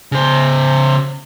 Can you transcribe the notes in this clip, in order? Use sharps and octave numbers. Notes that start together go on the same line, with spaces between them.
C#3 C5